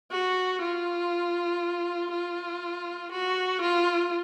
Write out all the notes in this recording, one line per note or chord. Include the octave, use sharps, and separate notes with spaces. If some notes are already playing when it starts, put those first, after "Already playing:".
F#4
F4
F4
F#4
F4